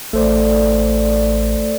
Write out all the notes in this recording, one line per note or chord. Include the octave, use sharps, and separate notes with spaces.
A1 A3 A4 C5 D5